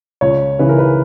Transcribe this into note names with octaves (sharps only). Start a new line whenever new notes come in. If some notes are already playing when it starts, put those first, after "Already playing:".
C#2 C#5
C#3 E3 B4
A#4
B4